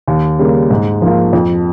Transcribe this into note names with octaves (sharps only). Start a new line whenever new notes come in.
D#2
C#3 G3 A#3
G#2
F3 A#3 F4
F2